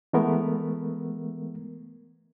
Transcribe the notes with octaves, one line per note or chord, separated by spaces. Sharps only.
E3 G#3 A3 B3 A#4